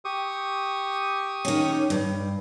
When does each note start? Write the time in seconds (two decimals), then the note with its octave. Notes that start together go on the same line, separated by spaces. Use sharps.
0.05 G4 C#6 D#6
1.45 D#3 C#4
1.90 G2